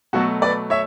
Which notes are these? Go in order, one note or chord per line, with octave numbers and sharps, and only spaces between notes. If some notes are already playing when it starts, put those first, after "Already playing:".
B2 F#3 A3 F#4 A4
B4 D5
C#5 E5